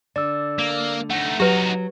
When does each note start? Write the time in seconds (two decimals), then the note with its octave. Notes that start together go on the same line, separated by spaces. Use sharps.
0.16 D3 D5 E6
0.59 A#3
1.10 A3 D#4 F#5
1.40 F#3 D#4 F#4 G4 B4